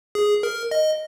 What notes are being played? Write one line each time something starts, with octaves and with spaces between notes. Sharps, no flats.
G#4
A#4
D#5